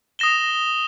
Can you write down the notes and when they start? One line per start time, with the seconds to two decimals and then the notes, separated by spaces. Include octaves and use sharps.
0.19 D#6 A#6 E7 G7